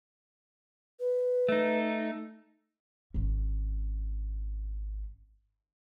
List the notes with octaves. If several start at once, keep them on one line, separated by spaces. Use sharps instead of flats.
B4
A3 D#4
G#1 C#4